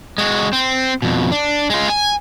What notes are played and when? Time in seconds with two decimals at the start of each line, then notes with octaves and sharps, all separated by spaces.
0.18 G#3 F#4
0.53 C4
1.02 F2 B2
1.32 D4
1.70 G#3 F4
1.90 G#5